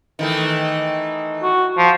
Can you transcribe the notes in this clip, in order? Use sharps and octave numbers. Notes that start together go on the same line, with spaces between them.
D#3 E3 A3
F#4
F3